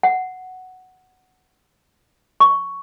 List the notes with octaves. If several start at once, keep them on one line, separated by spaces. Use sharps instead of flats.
F#5
C#6